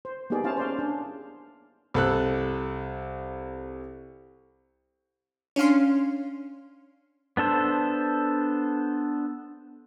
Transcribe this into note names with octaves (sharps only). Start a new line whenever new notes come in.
C5
A#3 B3 D#4 G4 G#4 D5
C#4 E4 C5 C#5 F5 A5
C5 D5 F5
D4 G#4
C2 A4 F#6
C#4 D4 F5 C6
B3 D4 A4 C5